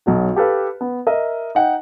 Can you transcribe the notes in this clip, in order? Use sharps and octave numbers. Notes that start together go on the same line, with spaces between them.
B1 F#3 F#4
G4 A4 B4 F5
B3
A#4 D#5 E5
D#4 F#5 G5